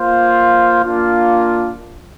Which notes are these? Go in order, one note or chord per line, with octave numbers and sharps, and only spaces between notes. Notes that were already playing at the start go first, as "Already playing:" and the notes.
Already playing: A#3 F4 C5 F5
A#3 D4 F4